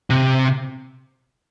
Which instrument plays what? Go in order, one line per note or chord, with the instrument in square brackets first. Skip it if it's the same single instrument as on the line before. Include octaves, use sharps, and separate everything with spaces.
[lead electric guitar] C3